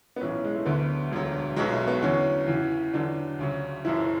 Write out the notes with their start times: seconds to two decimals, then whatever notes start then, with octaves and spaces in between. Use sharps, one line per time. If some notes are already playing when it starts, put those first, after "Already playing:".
0.16 B3
0.20 B1 A2 E3 C#4
0.44 G#3
0.55 A3
0.65 D2 D3 F#3 B3
1.11 E1 D2 D3 F#3
1.56 B1 B2 F#3 G#3
1.72 A3
1.87 B3
2.02 E2 D3 F#3 C#4
2.47 E2 C#3 E3
2.94 E2 D3 F#3 D4
3.39 D2 C#3 F#3
3.85 F#1 F#2 E3 E4